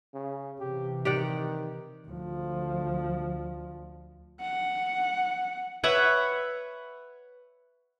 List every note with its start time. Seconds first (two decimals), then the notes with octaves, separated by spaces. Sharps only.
0.14 C#3
0.60 C3 E3 G4
1.05 D#3 G4 D5 F#5
2.08 D2 F3
4.41 F#5
5.84 B4 C#5 E5 F#5